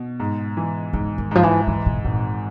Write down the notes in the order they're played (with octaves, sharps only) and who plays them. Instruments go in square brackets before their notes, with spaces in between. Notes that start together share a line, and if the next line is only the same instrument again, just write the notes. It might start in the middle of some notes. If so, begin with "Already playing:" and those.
Already playing: [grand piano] B2
G#2
E3
[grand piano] G#2 [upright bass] C#3
[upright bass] D#3
[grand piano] G#2 [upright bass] F3
[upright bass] E3
[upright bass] D#3 [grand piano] E3
[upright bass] B2
[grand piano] G#1 [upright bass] A#2